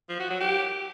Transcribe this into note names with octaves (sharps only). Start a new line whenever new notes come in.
F3
F#4
F#3
G4